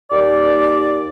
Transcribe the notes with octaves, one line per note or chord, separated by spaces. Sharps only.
D#2 D5